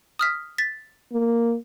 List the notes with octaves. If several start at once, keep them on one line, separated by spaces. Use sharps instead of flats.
D#6 F6 B6
A6 B6
A#3